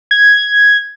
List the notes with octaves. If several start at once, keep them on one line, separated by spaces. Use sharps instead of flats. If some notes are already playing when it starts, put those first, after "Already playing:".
G#6